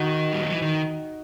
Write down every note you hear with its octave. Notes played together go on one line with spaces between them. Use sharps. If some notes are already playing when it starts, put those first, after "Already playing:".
Already playing: D#3 D#4 F#4
G3
F#3
E3
D#3